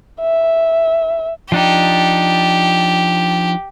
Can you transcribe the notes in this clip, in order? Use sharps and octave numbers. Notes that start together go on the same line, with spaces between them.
E5
F3 D4 D#4 G4